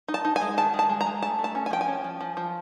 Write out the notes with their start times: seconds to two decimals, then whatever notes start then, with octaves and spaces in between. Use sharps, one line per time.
0.08 D#4
0.14 A5
0.25 D#4
0.36 G#5
0.42 G#3
0.57 D#3 A5
0.74 G#3
0.79 A5
0.89 G#3
1.01 A#5
1.06 G#3
1.22 A3 A5
1.39 A3
1.44 A5
1.55 C#4
1.66 G#5
1.71 F3 G5
1.81 G#5
1.88 C#4
2.04 F3
2.21 F3
2.37 F3